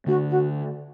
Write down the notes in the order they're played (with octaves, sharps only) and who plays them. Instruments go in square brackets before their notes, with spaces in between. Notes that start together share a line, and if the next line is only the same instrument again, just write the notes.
[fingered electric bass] D3 A3 D4 [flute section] F#4
[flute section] F#4